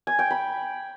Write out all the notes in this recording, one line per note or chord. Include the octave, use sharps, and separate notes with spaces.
G#5
G5
B5